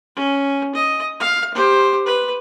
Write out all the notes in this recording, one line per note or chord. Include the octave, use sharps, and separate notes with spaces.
C#4
D#5
F5
G4 C5
B4